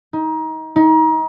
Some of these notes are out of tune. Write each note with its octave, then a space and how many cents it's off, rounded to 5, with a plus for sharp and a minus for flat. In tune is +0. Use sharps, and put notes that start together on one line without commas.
D#4 +25
D#4 +30